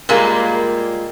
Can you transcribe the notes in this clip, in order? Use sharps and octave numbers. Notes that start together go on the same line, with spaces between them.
A#2 G3 G#3 A#3